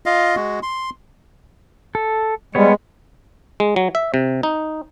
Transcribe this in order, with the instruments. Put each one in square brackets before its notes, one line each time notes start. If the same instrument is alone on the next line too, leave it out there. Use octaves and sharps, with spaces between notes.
[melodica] F4 D#5 F5
G#3 F#4
C6
[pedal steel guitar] A4
[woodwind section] G3 [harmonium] G#3 [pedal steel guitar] B3 C#5
[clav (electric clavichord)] G#3
F#3
E5
C3
D#4